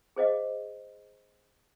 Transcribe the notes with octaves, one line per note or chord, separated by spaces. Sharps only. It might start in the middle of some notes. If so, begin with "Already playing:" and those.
G#4 C5 D#5 F5